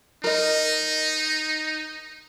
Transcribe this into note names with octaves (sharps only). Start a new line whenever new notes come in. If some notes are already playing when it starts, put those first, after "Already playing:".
D#4 A#4 D#5